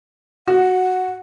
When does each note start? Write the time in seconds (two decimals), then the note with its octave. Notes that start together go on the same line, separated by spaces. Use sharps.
0.48 F#4 F#5